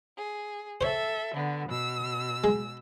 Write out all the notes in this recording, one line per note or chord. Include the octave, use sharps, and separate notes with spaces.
G#4
A4 C5 C#5 E5
D3 B3
B2 E6
G#3